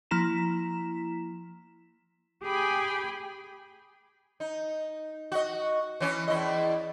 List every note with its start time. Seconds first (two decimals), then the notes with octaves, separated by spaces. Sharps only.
0.11 F3 A#3 E4 A#5 B6 E7
2.43 G4 G#4 G5 G#5 B5
4.40 D#4
5.32 F#4 D#5
6.00 E3 C#4
6.28 E2 E4 D#5